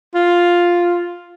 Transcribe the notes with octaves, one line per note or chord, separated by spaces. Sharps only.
F4